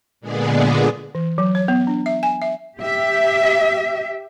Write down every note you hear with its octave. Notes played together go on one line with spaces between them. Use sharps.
A#2 D3 G#3 B3 G#4 D5
E3
F#3
C#5
B3
D4
E5
G#5
E5
G4 E5